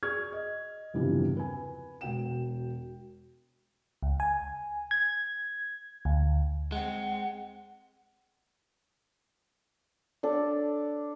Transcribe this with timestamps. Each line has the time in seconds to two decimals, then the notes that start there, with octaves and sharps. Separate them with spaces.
0.03 G#4 D5 C#6 F6 G#6
0.32 D#5
0.94 F#1 E2 G2 C3 E3 F3
1.37 B4 G#5
2.01 E1 F#4 G5 E7
4.03 C#2
4.20 G#5
4.91 G#6
6.05 D2
6.72 G#3 C4 F#5
10.23 D4 A4